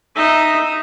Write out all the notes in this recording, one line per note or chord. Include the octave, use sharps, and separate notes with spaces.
D#4 E5